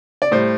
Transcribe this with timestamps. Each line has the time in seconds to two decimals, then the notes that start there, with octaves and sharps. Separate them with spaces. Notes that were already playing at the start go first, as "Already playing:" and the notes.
0.22 D5
0.32 A2 G3 C5